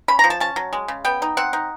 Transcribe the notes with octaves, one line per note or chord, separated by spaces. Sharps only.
C#4 B5
A#5
F3
A5
C#4 A5
F#3
G#3
C#3
B3 G5
D#4
C4 F#5
D#4